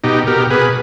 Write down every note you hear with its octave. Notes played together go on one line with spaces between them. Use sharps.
B2 D#4 G4
B2 G4 A#4
B2 G#4 B4